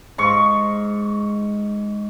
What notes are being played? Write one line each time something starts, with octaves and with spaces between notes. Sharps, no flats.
G#2 C#6